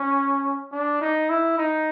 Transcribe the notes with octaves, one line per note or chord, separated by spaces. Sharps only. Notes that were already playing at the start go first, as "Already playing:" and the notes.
Already playing: C#4
D4
D#4
E4
D#4